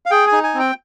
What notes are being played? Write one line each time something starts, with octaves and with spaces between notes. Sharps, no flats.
F5
G#4 G5
G#5
D#4
G#5
C4
G5